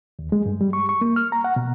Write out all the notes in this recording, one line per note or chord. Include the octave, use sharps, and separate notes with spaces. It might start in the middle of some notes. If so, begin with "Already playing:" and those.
D#2
G#3
G2
G3
C#6
C#6
A#3
F6
A#5
F#5
B2